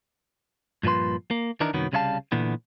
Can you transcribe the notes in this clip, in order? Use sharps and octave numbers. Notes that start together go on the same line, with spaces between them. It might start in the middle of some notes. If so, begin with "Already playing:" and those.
G2 A#2 F3 B4 C6
A#3
D#3 E3 D4 D#4 A#4
C2 F#2 D#3 F#3 B3
C2 C#3 G3 E4 F5 A5
A#2 D3 E3 B3